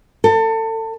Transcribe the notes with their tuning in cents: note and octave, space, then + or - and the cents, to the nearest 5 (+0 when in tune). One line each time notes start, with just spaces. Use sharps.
A4 +30